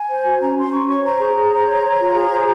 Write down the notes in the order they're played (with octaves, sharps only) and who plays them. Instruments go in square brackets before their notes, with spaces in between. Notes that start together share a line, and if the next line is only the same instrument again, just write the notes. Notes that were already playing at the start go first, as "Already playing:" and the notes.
Already playing: [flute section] G#5
C5
F#4
C#4 A#5
C#4 C6
C#4 C#6
C#5 C#6
C5 A#5
G#4
G#4
C5
C#5
C#5
F4
G#4
C5